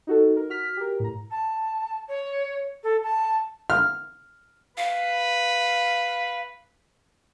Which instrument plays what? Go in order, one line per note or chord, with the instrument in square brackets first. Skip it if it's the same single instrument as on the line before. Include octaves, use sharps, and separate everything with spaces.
[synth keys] D#4 F#4 A4
A#4
F#4 F6 B6
G4 A#4
A2 A#5
[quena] A5
C#5
A4
A5
[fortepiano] F6
[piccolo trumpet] B4 [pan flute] F5